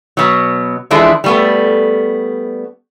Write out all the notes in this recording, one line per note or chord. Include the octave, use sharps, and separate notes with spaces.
B2 F#3
E3 F3 G#3 D4 E4 A4
G3 A3 B3